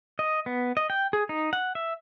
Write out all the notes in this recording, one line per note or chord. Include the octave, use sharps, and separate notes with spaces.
D#5
B3
D#5
G5
G#4
D#4
F#5
E5